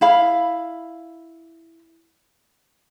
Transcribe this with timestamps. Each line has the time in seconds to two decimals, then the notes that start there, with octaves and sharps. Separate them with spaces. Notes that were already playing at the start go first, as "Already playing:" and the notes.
0.01 E4 F5 B5